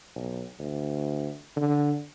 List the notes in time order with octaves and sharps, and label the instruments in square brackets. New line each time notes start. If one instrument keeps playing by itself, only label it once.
[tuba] B1
D2
D3